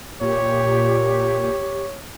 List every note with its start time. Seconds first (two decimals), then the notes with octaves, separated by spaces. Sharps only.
0.21 A#2 G4 C#5